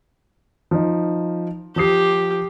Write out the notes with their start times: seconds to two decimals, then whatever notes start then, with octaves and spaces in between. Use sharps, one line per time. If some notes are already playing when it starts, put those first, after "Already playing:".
0.71 F3 D#4
1.76 F3 G4 D#6 C7